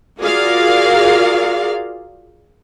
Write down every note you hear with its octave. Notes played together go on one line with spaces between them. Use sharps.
F4 F#4 G#4 A#4 D5 F5